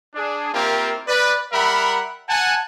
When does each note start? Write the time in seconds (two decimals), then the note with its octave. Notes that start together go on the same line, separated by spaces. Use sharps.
0.15 D4 G#4
0.54 A#3 C4 E4 F4 G4 A#4
1.08 B4 D5
1.53 G3 A#4 E5 F#5 B5
2.29 F#5 G#5 A5